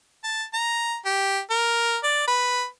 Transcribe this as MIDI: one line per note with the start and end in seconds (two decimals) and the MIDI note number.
0.24 0.43 81
0.53 0.97 82
1.05 1.39 67
1.50 1.97 70
2.04 2.24 74
2.28 2.64 71